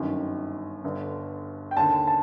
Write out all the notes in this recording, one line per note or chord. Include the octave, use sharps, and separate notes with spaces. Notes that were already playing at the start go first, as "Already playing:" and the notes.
Already playing: G1 F#2 D#3
G1 G2 D3
G5
D#2 D3 A5
A5